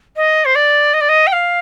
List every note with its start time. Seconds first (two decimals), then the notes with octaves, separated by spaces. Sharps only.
0.16 D#5
0.45 C5
0.55 D5
0.94 D#5
1.01 D5
1.09 D#5
1.27 G5
1.32 F5